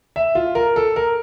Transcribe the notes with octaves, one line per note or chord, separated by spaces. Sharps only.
E5
F4
A#4
A4
A#4